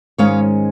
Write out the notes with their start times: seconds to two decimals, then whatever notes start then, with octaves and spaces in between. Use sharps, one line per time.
0.18 G#2 D#3 G#3 C#4 C#5 F5